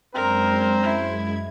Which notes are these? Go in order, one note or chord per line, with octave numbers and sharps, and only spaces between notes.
F#2 G#3 C4 D4 A#4 C5 A#5 G#6
E4